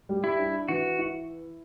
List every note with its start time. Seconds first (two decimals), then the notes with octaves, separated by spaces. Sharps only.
0.09 G3
0.24 E4
0.39 D4
0.68 E3 F#4
0.98 E4